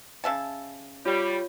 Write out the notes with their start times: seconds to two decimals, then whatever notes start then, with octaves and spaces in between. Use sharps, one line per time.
0.24 C#3 E5 A5
1.06 G3 F4 C#5